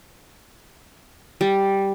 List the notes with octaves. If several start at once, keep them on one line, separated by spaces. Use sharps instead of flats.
G3